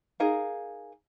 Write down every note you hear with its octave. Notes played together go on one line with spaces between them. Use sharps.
D#4 G#4 A#4 F5